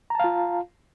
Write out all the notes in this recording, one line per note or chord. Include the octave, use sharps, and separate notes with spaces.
F4 F5 A5 A#5